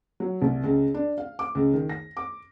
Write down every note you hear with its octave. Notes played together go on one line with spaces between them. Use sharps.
F#3
C2
C#2
D4
F5
D6
C#2
D#3
A#6
D6